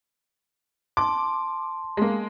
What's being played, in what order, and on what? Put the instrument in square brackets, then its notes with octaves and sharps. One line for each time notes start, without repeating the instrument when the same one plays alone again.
[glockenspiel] A5 C6 [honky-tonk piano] D6
[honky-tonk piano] G#3 A#3